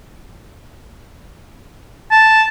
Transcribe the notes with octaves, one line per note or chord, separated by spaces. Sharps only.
A5